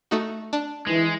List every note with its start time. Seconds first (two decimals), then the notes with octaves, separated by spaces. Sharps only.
0.11 A3 D#4 F#4
0.53 D4
0.87 E3 G#3